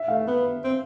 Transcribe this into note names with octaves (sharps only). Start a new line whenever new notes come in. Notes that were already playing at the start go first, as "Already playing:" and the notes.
Already playing: E5
A3 F5
B3
C4